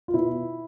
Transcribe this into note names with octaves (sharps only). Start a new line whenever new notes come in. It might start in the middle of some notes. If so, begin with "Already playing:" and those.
F4
B2 E4